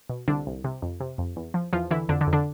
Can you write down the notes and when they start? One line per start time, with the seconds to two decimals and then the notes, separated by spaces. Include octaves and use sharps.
0.10 B2
0.28 C2 D3 D4
0.47 C2
0.64 C3
0.82 F2
1.00 C3
1.18 F2
1.36 E2
1.54 F3
1.73 E2 F3 F4
1.91 D3 E3 E4
2.09 F2 D3 D4
2.21 D3 D4
2.27 F2
2.33 D3 D4